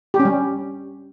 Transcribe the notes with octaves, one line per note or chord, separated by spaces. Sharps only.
G4
C#4
G3